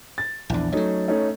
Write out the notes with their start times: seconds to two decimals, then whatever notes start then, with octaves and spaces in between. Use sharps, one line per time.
0.18 A6
0.50 A#1 E2 E3 D4
0.72 F3 F#3 A3 C#4 D#4
1.08 A3 C#4 D#4